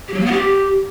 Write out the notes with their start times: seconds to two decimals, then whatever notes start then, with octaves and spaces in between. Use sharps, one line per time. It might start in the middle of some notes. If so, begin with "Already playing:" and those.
0.08 G4
0.14 F#3
0.19 A#3
0.25 B3
0.31 G4